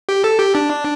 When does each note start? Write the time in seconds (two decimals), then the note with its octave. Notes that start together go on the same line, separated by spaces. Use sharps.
0.09 G4
0.24 A4
0.39 G4
0.55 D4